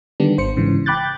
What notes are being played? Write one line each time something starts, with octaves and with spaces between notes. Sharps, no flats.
D3 D#3 G3 B3 D4
G#1 C5 C#7
G#2 C#3 E3
G5 B5 D6 F#6 G6 A6